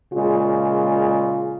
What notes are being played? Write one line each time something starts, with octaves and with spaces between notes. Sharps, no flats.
A#2 C#3 G#3 F4